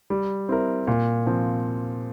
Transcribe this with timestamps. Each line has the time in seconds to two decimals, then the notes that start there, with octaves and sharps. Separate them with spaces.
0.10 G3
0.49 C4 E4 A#4
0.87 A#2
1.26 F3 C4